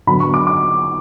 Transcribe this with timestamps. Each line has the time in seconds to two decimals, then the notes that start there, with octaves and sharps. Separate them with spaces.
0.07 D3 F#3 B3 B5
0.20 C#6
0.34 D6
0.47 D6